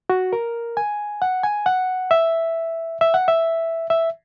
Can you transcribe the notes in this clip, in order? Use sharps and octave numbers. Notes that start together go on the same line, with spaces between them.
F#4
A#4
G#5
F#5
G#5
F#5
E5
E5
F#5
E5
E5